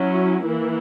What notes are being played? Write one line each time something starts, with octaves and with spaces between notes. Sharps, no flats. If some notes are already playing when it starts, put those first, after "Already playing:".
Already playing: F#3 C#4 E4
E3 A#3 E4